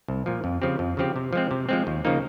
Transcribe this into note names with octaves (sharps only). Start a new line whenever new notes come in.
C2
A#2 F3
F2
C#3 F3 C4 G4
F2
C#3 F3 C4 G4
C3
F3 G#3 C4
C3
F3 G#3 C4
D#2
C#3 F3 A#3 D#4